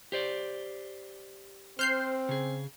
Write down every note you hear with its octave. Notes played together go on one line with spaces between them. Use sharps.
G4 C5 D5
C4 C5 F6 G6 C7
C#3 G#4